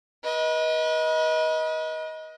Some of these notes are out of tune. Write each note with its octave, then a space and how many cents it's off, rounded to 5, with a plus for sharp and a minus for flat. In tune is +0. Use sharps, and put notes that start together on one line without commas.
B4 -35 D#5 +20